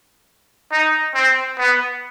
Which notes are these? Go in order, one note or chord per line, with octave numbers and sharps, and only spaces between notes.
D#4
C4
B3